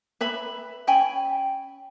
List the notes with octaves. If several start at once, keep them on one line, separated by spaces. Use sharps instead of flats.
B4 E5 B5
C#4 G5 G#5 B5